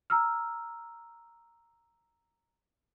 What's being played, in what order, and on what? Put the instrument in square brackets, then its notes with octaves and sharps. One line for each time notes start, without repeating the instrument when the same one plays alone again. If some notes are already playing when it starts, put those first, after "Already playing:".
[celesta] A#5 E6 F6